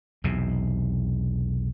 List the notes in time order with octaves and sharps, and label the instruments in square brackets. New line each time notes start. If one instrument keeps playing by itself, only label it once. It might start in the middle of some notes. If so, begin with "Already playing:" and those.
[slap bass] B1 E2 C3